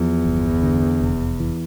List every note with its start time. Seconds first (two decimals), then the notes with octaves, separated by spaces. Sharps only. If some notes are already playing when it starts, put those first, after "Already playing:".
Already playing: E2 F3
0.25 G1
0.63 D3
1.01 F1
1.40 E3